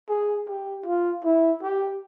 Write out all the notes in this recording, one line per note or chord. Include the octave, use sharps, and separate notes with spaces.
G#4
G4
F4
E4
G4